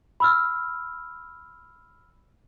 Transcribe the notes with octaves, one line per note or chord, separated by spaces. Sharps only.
B5 E6 F6